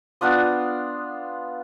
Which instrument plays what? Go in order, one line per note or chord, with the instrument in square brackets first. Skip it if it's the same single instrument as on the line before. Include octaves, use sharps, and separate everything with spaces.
[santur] B3 D4 F4 D#6